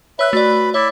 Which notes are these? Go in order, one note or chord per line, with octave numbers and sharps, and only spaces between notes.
B4 C#5 E5 B5 E6 F#6
A3 F#4 D5
E4 C#5 D5 E5